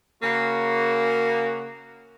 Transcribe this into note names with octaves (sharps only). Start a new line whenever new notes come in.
C#3 A#3 F#4